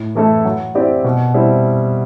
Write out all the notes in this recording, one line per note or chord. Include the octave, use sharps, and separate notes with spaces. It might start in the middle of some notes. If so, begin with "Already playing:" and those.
Already playing: A2
E3 A3 E4 A4
F#3
C4 E4 G4 D5
B2
G3 C4 E4